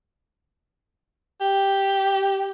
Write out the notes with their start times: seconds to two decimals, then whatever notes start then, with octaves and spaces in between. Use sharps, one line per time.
1.41 G4